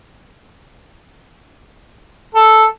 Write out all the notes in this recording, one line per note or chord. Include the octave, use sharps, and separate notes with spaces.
A4